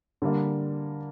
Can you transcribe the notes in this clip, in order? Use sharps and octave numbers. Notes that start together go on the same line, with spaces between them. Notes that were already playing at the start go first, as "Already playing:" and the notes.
D3 G3 A#3